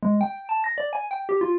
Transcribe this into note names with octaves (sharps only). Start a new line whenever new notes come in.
G#3
G5
A5
A#6
D5
G#5
G5
G4
F4